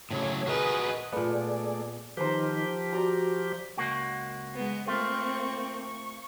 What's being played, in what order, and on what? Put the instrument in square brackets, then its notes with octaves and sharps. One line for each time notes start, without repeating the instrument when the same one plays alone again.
[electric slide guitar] A2 C#3 F#3 [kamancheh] C#5
[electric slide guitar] F#4 A#4 D#5 [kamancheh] G#4 B4
[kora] A#2 B3 [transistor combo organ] A3 G#4 D5
[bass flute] D#3 [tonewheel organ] F3 G4 [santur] B4 C5 A#5
[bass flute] F#4 [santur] D5 A#5
[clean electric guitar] C#2 A#3 F#4
[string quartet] G#3 B3
[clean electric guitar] A3 F4 [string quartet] A#3 C4 C#6
[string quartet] C#6